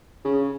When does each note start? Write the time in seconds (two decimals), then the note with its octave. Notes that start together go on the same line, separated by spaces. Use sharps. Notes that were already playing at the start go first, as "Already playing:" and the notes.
0.25 C#3